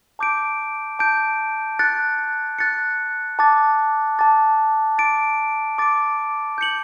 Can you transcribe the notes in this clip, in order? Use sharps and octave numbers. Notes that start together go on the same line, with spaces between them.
A5 D6 G6 D7
A5 D6 G6 D7
F#6 A6 C#7
F#6 A6 C#7
A5 D6 A6
A5 D6 A6
D6 A6 D7
D6 A6 D7
G6 C#7 F#7